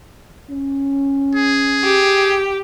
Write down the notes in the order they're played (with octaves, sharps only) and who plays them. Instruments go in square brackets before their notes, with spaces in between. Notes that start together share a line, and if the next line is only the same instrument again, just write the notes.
[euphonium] C#4
[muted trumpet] G#4
[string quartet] G4